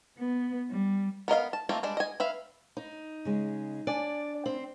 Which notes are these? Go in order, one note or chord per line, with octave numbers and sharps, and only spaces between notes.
B3
G3
B3 A#4 D#5 F5
A5
D#3 A3 A#3 C4 F4
G3 G#3 D4
D#5 G#5
B4 E5 F5
D#4
C#3 G#3
D4 D5 G#5
C4